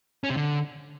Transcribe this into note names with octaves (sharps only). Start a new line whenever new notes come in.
C#4
C3
D3